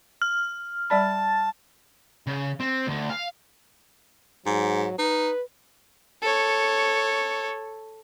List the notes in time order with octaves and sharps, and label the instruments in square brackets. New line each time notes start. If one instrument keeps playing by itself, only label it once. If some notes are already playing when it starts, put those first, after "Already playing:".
[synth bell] F6
[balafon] G3 D5 B5 [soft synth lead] A5
[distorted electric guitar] C#3
C4
D2
F5
[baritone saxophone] G#2 [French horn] F#3
[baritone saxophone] D#4 [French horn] B4
[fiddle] A4 C#5